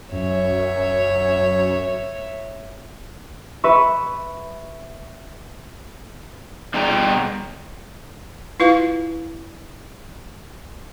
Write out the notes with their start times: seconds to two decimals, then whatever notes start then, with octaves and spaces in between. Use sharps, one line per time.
0.13 F#2 C#5 E5
3.64 B4 E5 C#6
6.74 B2 D3 G3 G#4 G5 A#5
8.60 E4 F4 B4 F5